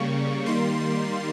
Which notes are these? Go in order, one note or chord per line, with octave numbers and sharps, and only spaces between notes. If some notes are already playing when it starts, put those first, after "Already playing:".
Already playing: C#3 G3 A#3 C#6
D#3 G3 A#3 C6